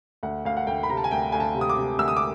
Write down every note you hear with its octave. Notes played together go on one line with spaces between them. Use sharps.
D2 F#5
D2 F5
F#5
D2 G5
B5
C3 A#5
A5
G#5
D2 G5
D2 G#5
A5
C3
D#6
D6
C3
D2 E6
D#6
D6